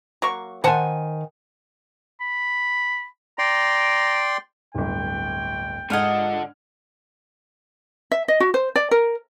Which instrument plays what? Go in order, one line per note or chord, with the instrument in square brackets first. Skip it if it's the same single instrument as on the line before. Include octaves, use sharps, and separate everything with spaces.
[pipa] F#3 A#3 C#6
[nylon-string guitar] D#3 G#5 [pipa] C5 F#5 A5
[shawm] B5
[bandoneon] D5 G5 C6 [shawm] A#5
[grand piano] D1 G1 [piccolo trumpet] G5
[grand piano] G#2 F6 G#6 [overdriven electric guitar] D3 F#5 [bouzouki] F4 A4 D#5
[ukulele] E5
D#5
F#4
C5
D5
A#4